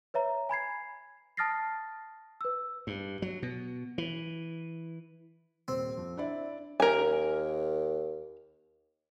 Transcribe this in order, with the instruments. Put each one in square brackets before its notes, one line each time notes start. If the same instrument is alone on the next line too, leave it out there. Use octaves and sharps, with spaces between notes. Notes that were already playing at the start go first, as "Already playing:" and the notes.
[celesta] B4 C#5 E5 A#5
G#5 B5 G#6 C7
A5 D#6 F6 A6 A#6 C7
B4 E6
[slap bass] G2
F#3
B2
E3
[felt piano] D#1 [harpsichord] C4
[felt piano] F2
D4 E4 D5
[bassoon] D#2 [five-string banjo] A#4 G#5